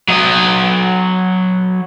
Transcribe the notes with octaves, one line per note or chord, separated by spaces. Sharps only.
F#3 D#5